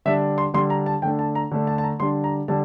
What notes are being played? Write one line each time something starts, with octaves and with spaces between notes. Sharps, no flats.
D3 G3 D4 E5
C6
D3 G3 D4 C6
A#5
A5
D3 A3 D4 G5
A5
A#5
D3 A3 D4
A5
A5
A#5
D3 G3 D4 C6
A#5
D3 G3 D4 A5